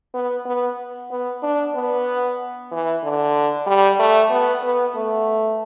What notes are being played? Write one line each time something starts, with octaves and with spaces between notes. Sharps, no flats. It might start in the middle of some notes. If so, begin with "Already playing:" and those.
B3
B3
B3
D4
B3
E3
D3
G3
A3
B3
B3
A3